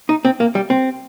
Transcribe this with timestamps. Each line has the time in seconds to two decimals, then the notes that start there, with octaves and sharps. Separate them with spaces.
0.09 D#4
0.25 C4
0.40 A#3
0.55 G3
0.70 C4